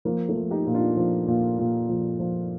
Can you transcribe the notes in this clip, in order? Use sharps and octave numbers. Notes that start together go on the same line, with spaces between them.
F3 A#3
A3
F3
D#4 G4
A#2
D4 F4
F3
A#2
A#2
F3
F3